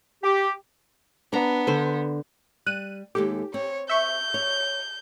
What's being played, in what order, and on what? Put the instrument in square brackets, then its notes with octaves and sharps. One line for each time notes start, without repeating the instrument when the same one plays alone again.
[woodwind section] G4
[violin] B3 [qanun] D4 A#5
[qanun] D3 C5
[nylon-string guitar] G3 [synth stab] F#6 D#7
[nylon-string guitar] D#2 G#3 A4 [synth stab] G4
[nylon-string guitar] C4 [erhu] C#5
[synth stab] E5 C#6 [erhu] G6
[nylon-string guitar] C#5